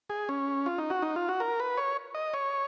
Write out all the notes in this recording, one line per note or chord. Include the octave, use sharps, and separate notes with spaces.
G#4
C#4
F4
D#4
F#4
D#4
F4
F#4
A#4
B4
C#5
D#5
C#5